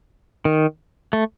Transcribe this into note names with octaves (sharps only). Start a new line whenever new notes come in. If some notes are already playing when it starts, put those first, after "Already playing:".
D#3
A3